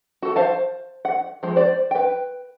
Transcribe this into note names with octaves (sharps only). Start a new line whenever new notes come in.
F#4 A4
C5 F5 A5
F#5
F3 G#3
C5 D5
B4 G5